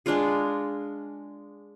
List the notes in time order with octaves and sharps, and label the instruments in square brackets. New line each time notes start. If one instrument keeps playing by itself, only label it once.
[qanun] G#3 D4 F4 G#4